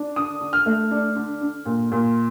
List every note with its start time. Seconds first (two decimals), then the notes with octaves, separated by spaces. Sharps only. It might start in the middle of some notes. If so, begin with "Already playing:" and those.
Already playing: D4
0.16 D3 D#6
0.40 D3
0.53 F6
0.66 A3
0.91 D4
1.16 D3
1.41 D3
1.66 A#2
1.92 A#2